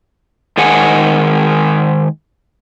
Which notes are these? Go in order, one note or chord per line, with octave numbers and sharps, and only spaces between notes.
D#3 G#3 G#4 F#5 G#5